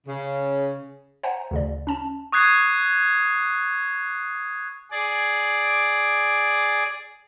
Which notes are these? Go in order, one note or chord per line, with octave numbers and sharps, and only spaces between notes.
C#3
C5 E5 F#5 G#5 A#5
D2 C#3 D5
C#4 A5
C#6 D#6 F#6 G#6 C7
G#4 D5